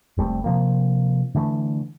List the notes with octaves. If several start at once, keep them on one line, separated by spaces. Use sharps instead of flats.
F1 G3 A3 C4
C3 F3 A#3
D3 E3 A3